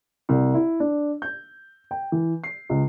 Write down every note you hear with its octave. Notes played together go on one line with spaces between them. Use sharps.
C2
E4
D4
G6
G5
E3
C7
C#2